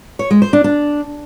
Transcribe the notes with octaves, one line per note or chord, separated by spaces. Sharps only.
C#5
G#3
C5
D4
D4